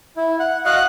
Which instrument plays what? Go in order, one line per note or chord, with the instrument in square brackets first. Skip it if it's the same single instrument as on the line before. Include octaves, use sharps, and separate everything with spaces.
[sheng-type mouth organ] E4
F#5
[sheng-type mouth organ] F#4 D#5 F5 [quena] F#6